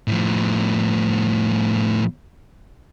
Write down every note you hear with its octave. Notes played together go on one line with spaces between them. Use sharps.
A2 F3